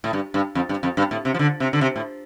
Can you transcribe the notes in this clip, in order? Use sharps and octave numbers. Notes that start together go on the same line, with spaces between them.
A2
G2
G2
F2
G2
F2
G2
A2
C3
F3
D3
C3
D3
C3
A2